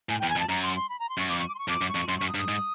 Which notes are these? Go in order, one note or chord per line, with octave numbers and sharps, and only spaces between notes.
A2 G#5
E2 G5
G#5
F2
A5
F#2 A#5
C6
C6
B5
A#5
C6
F#2 C#6
F2 D6
C#6
D6
C6
C#6
F2 D6
F#2
C#6
F2
F#2 C6
F#2 C#6
D#6
G2
D#6
G#2